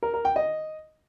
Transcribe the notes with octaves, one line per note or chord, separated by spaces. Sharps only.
A#4
A#4
G5
D#5